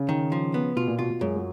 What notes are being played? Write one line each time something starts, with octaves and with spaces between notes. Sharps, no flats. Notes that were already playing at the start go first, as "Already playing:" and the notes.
Already playing: C#3
D#3
F3
B3
B2 F4
A#2
B2 F4
B2
F#2 G#3
F#3